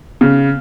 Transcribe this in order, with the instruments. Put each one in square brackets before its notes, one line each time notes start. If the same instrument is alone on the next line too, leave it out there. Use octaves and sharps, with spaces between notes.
[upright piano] C#3